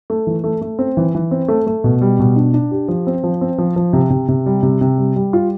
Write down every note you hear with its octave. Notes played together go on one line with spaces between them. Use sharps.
A3
E3
A3
A3
C4
E3
E3
C4
A3
A3
B2
G3
B2
D4
D4
G4
F3
C4
F3
C4
F3
F3
C3
C3
C3
G3
C3
C3
G3
G3
F4